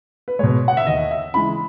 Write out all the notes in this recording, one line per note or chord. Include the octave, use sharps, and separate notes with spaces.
B4
B2 G#3 C#5
F#5
E5
D#2 D#5
E5
C#3 E3 G#3 B5